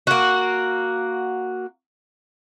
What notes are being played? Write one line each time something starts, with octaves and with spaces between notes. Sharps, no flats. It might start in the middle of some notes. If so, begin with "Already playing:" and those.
A#3 F#4